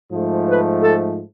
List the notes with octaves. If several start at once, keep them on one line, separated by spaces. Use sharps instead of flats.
G#2 F3 A3
B4
A4